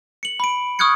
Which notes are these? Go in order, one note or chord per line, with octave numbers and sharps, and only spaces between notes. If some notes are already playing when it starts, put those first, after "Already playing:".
C#7 F#7
B5 D7
C#6 D#6 F6 F#6 G#6 C#7